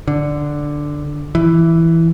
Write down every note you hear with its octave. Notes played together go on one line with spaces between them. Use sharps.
D3
E3